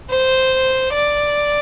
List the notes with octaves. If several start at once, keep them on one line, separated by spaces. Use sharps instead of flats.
C5
D5